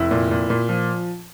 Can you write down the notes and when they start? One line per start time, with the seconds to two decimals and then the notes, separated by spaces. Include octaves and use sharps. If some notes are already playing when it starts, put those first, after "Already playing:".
Already playing: F1 E4
0.11 A#2
0.31 A#2
0.50 A#2
0.69 F3